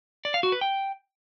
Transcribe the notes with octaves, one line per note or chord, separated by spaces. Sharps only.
D5
F5
F#4
B4
G5